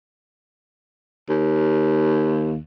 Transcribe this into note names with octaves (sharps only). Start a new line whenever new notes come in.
D#2